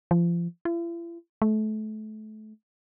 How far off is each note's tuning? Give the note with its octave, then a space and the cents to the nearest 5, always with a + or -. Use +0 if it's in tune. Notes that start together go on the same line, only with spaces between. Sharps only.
F3 -30
E4 +45
A3 -30